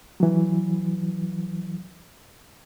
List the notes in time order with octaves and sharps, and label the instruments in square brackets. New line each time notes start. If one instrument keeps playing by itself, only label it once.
[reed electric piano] E3 F#3